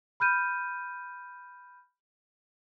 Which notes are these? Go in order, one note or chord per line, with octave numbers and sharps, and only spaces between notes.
B5 F6 G6 D#7